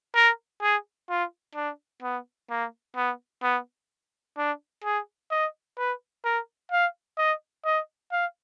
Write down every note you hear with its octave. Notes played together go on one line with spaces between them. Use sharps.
A#4
G#4
F4
D4
B3
A#3
B3
B3
D4
G#4
D#5
B4
A#4
F5
D#5
D#5
F5